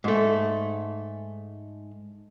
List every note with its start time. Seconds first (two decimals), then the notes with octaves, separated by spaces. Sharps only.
0.04 G#2 A3